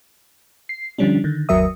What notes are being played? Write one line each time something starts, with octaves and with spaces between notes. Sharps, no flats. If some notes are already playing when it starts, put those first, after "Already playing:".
C7
D3 F3 G3 C#4 D4
D3 D#3
G1 D#2 F#3 A#4 E5 D#6